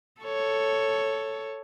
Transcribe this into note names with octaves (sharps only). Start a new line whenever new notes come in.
A4 C#5